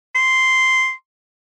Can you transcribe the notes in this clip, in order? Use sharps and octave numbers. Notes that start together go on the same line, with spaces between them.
C6